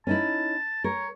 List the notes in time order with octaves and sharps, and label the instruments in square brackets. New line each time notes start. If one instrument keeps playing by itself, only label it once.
[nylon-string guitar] C#4 D#4 E4 [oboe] A5
[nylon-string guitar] A#4 [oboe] C#5